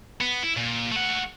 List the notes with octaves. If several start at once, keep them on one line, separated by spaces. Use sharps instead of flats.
B3
E4
A#2
A3 F#5